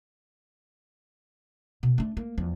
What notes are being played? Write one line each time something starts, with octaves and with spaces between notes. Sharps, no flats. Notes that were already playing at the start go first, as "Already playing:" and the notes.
B2
A3 D4
A#3
E2 F3